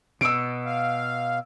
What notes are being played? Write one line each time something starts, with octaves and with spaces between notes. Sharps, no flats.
B2 E6 D7
F5